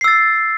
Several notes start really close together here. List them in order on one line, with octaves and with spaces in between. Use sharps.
C7 E6 A6